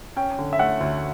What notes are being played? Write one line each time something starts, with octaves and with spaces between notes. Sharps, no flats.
C#4 G5
D3
E5
A3 F#5
D2